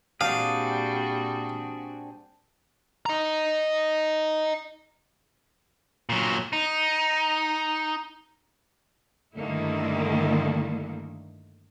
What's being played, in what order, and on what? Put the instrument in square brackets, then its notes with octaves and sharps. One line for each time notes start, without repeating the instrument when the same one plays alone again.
[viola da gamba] A#2 G3 F#4 [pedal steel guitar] C4 D4 G#4 [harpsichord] F5
[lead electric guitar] D#5 A#5
[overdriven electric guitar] A#2 F#3
D#4
[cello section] G2 D3 D#3 A3 A#3 E4